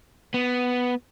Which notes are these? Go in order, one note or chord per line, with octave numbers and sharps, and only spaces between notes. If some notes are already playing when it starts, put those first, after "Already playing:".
B3